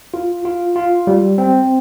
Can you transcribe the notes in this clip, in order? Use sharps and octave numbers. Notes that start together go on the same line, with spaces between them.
F4
F4
F4
G3
C4